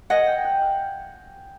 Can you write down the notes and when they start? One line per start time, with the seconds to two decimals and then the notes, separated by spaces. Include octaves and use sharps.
0.10 A#4 D#5 F#5 G#5
0.27 G5
0.44 F#5
0.62 F5